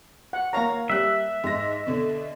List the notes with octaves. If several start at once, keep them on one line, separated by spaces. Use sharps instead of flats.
F#5
A#3 C#5 F5 A#5
G3 E5 F#6
G#2 A#6
B2 D3